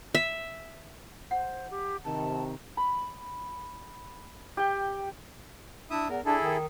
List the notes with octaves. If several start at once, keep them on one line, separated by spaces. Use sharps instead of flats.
E5
C5 F#5
G4
C3 D#3 A5
B5
G4 G5
D4 E4 E5 D#6
E2 A#4
D4 E4 G#4 A4
D#3